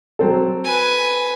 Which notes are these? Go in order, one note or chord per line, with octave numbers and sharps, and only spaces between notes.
F#3 C4 A4
B4 G#5